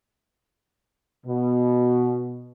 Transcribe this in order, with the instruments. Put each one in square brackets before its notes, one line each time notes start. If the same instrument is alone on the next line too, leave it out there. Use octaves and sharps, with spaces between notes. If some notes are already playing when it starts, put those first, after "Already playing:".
[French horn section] B2